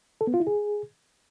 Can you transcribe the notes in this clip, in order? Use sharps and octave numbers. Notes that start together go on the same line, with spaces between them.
A4
B3
F4
E4
G#4